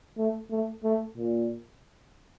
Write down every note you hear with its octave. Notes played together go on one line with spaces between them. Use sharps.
A3
A3
A3
A#2